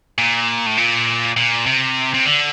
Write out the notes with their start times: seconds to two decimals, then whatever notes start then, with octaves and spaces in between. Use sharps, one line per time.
0.19 A#2
0.67 A2
0.77 A#2
1.37 A#2
1.66 C3
2.14 C3
2.25 D3